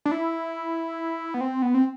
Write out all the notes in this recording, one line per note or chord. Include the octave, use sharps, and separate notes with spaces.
D4
E4
B3
C4
B3
C4